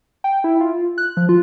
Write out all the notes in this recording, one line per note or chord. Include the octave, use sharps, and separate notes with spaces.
G5
E4
F4
F#6
F3
F4